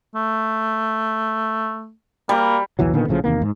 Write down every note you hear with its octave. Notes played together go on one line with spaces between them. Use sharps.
A3
G3 A#3
A#1 D#2 E3 F#3
A#2 D3 D#3 B3
A#1 A2 C#3 F3
E2 C3 D#3 A#3
G#2